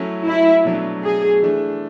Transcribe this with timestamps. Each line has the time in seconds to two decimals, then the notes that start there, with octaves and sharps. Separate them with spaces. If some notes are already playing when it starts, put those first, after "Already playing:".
Already playing: F#3 A3 C#4 E4
0.27 E4
0.65 B2 F#3 A3 D4
1.04 G#4
1.42 E3 A3 D4